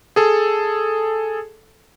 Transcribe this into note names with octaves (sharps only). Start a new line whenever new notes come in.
G#4 A4